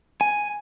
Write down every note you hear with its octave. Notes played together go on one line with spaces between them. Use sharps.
G#5